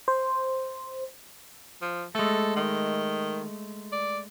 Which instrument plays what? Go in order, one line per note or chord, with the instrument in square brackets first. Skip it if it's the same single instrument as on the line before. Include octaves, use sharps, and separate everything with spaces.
[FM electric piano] C5
[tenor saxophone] F3
[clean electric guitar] G#3 A3 [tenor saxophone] A4
[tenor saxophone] D#3
D5